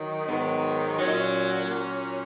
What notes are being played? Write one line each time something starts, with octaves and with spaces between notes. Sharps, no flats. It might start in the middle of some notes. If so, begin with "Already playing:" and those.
Already playing: D#3 F#3
G#2 D#3 F#3 B3
A#2 F#3 C#4 D#4
C#4
A#2 F#3